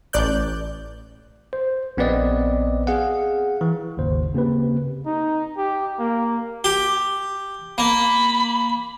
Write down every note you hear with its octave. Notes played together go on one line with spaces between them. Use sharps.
A1 D5 F#6 G6
C5
A#1 B3 C4 B4 D5 D#5
G#4 F5 F#5
E3
G#1 D#2 C#3 C5
C#3 A#3 C4 G4 B4
D#4
G4
A#3
G4
A#3 B5